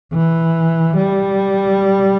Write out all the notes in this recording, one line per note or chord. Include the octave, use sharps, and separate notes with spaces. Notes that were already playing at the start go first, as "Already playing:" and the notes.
E3
G3